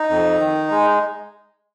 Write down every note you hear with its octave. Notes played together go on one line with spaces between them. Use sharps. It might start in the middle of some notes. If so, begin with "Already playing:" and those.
Already playing: D#4
F2
D#3
G#3